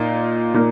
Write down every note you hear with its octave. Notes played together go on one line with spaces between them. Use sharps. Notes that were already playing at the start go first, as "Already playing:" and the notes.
Already playing: A#2 A#3 D#4
A#2 A#3 D#4 A#4